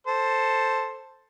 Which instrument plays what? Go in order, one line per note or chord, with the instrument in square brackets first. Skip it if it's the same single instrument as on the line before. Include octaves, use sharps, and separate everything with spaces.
[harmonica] A4 C5